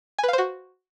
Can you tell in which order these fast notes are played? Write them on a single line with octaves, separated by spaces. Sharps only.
G#5 B4 F5 C5 F#4